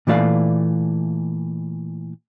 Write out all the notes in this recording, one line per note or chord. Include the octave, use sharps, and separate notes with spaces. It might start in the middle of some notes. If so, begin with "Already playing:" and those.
A#2 E3 A3 D5 F5